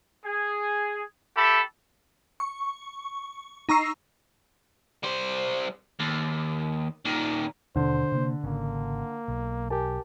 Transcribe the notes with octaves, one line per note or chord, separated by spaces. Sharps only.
G#4
G4 A4 E5 B5
C#6
D#4 A#5 C#6 E6 C7
G3 C5
D#2
A#2 D#3
D#2 B2 D3 C5
C3 A#3
G#1 C#3 A#3
B1
G4 A#4 G#5 A5